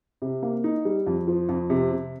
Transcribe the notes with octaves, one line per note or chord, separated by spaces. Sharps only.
C3
A#3
D#4
G3
F2
F3
F2
C3
C3